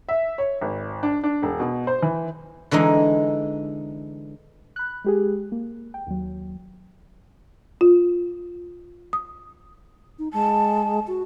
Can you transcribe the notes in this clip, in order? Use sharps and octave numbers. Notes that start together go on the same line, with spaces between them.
E5
C#5
G#1
D4
D4
E1
B2
C5
E3
D3 E3 G#3 D#4
B5 F#6
G#3 G4 G#4
A#3
G5
D#2 F#3
F4
D#6
D#4
G#3 A5
F#4